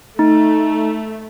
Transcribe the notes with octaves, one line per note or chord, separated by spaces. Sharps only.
A3 D#4